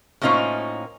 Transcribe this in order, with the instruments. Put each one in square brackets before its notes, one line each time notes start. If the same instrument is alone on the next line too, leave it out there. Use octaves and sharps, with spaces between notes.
[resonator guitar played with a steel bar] A2 A#3 C#4 D#4 F4 C5